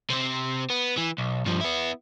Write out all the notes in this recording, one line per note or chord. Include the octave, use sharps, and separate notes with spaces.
C3 C4
B3
E3
B1
G2 F3
B3 E4